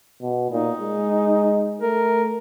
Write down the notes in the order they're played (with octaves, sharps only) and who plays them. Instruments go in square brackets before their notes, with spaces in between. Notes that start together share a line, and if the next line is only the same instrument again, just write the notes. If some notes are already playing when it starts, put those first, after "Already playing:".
[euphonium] B2
[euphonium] A#2 [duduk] D#4
[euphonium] G#3
[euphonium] A3 [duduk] A#4